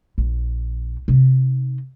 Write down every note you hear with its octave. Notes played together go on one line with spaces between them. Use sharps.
A#1
C3 D#4